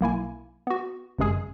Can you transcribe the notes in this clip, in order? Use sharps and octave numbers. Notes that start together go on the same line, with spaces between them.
B1 A#3 E4 G#5
B3 F#4
G1 F#2 C3 G#3 G#4 G#5